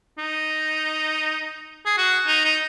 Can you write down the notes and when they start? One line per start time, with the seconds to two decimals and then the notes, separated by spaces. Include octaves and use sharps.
0.18 D#4
1.86 G#4
1.98 F#4
2.27 D#4
2.45 D#4